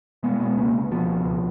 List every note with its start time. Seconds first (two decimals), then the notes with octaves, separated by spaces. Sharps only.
0.23 B2 G#3 B3
0.40 B2 G#3 B3
0.57 C#2 A#3 C#4
0.74 C#2
0.91 B2 F3
1.09 B2
1.26 C#2